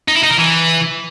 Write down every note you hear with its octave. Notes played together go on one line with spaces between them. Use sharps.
D#4
E4
D#4
A#4
E3